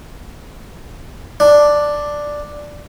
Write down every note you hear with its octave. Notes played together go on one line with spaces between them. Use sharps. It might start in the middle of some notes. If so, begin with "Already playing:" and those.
D4